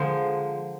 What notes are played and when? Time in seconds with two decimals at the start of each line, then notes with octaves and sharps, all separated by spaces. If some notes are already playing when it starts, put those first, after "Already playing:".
Already playing: D3 F3 G#3 A#4 C5